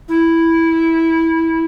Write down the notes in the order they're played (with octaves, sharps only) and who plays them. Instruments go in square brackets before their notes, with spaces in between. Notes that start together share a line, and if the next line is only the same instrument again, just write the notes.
[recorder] E4